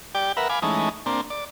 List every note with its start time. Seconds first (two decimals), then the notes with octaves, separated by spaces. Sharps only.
0.15 G4 D5 G5
0.37 A#4 B4 E5 F#5
0.50 F5 G#5 B5 D6
0.62 E3 G#3 A3 C#4 D#4
1.06 A#3 C4 D4
1.30 D5